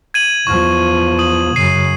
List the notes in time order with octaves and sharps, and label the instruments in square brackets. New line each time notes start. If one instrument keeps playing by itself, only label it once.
[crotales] G#6 D#7 F#7
[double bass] E2 F3 [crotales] C#6
[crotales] D#6 D#7 F#7
[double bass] F#2 C#3 [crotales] C7 D#7